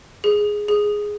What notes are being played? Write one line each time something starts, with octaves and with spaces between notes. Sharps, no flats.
G#4
G#4